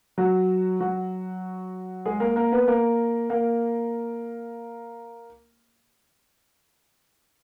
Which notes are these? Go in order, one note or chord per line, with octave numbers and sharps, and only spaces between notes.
F#3 F#4
F#3 F#4
G#3 G#4
A#3 A#4
A#3 A#4
B3 B4
A#3 A#4
A#3 A#4